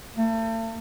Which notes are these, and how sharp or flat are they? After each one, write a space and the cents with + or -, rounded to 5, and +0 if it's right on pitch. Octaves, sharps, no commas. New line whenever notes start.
A3 +40